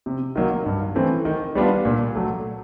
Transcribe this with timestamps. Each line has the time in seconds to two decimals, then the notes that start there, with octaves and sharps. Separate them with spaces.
0.06 C3
0.36 D#3 F#3 A#3
0.66 G2
0.95 E3 A3 C4
1.25 D#3
1.55 G3 B3 D4 F4
1.85 A#2
2.15 F#3 A3